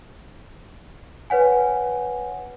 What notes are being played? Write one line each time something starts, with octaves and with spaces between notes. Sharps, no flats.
B4 C#5 F#5 G#5